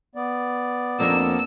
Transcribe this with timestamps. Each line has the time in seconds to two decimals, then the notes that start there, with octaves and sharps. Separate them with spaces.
0.15 B3 D5
1.00 F2 A#3 C#4 D4 E6